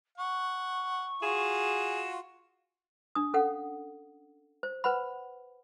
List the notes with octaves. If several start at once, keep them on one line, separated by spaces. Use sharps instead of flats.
F#5 C#6
F4 F#4 G#4 E7
D4 D#6
C#4 A4 F5 F#5
C5
B4 C5 F#5 B5